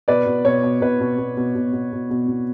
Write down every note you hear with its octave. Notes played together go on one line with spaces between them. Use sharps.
B2 B4 D5
B2
B2 C#5
B2
B2 B4
B2
B2
B2
B2
B2
B2
B2
B2